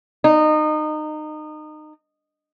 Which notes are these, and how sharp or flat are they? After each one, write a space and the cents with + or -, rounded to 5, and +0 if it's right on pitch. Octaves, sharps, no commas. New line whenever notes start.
D#4 -25